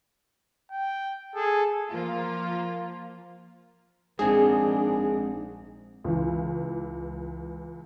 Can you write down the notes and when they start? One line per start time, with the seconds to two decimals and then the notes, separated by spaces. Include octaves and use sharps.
0.71 G5
1.35 G#4 A4
1.89 F3 A#3 F4
4.19 A#1 G#2 C4 D4 G#4
6.04 C#2 E3